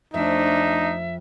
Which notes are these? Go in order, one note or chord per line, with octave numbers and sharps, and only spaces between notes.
F2 A3 D4 D#4 E5